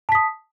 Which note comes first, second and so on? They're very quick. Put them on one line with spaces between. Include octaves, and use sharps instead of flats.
A5 B6 D#6